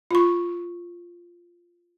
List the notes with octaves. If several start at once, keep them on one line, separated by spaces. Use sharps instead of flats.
F4 C#6